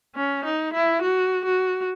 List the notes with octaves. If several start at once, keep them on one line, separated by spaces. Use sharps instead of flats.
C#4
D#4
E4
F#4
F#4